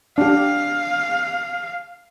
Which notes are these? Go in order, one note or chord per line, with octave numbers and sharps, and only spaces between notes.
D4 G4 F5